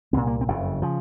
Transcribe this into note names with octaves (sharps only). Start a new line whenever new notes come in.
C2 A#2 C4
A#3
C4
F#1 F2 C#3
C#3 F3